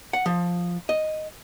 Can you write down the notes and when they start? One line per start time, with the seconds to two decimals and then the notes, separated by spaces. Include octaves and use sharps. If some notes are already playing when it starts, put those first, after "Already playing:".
0.13 F#5
0.26 F3
0.89 D#5